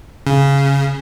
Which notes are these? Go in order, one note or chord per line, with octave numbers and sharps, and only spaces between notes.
C#3